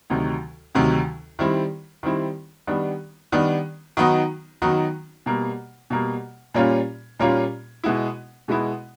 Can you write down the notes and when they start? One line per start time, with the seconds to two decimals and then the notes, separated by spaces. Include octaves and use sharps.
0.10 D2 C3 D#3 F#3
0.75 D2 C3 D#3 F#3
1.39 D#3 G3 C4 E4
2.03 D#3 G3 C4 E4
2.67 D#3 G3 B3 D4
3.32 D#3 G3 B3 D4
3.97 D#3 F#3 B3 D#4 F#4
4.62 D#3 F#3 B3 D#4 F#4
5.26 B2 G3 A#3
5.90 B2 G3 A#3
6.54 A#2 G3 A#3 C#4 F4
7.19 A#2 G3 A#3 C#4 F4
7.84 B2 G#3 B3 E4
8.48 B2 G#3 B3 E4